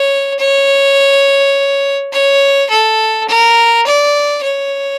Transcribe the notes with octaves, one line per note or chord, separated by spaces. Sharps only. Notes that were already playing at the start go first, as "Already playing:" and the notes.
Already playing: C#5
C#5
C#5
A4
A#4
D5
C#5